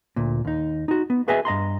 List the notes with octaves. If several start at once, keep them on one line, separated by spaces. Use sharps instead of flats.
D2 A#2
D#2 D#4
D#4 F#4
B3
F#4 G#4 B4 D#5 E5 G#5
G2 D#5 A#5 C6